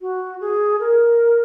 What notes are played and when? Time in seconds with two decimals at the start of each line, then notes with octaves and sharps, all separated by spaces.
0.01 F#4
0.41 G#4
0.80 A#4